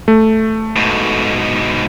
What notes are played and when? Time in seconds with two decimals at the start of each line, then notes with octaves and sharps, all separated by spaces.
0.08 A3
0.76 G#2 B2